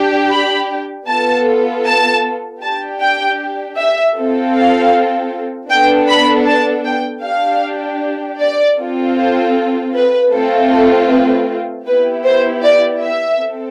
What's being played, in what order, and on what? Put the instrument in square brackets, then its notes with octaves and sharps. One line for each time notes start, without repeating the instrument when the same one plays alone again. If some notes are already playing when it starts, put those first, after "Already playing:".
Already playing: [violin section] D4 G4
B5
B3 F4 A4 A5
A5
D4 G4 A5
G5
E5
C4 F4 A4
F5
B3 D4 A4 G5
B5
A5
G5
D4 G4 F5
D5
C4 F4 A4
C5
B4
A3 C4 F4 A4
A4
B4
B3 E4 G4 B4
C5
D5
E5
C4 A4